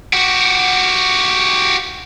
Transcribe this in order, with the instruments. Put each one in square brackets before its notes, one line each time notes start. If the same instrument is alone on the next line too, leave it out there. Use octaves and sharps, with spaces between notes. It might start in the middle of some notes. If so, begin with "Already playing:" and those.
[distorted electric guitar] F#4 G4